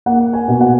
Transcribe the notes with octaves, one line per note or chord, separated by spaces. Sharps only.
A#3 F#5
G#5
B2
F#5